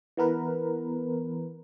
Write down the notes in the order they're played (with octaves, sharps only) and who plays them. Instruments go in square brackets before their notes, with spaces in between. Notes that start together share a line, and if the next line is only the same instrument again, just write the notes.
[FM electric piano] E3 B3 A#4 B4